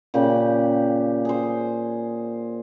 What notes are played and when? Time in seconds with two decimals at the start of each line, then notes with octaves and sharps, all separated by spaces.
0.14 A#2 C#3 G4 B5
1.25 G#4 C5